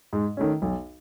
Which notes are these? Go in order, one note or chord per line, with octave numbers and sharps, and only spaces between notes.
G#2
D#3 A3 C#4
B1